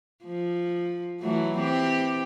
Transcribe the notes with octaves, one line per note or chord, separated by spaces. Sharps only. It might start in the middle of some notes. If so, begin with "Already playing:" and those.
F3
E3 F#3 A3
E3 C4 G4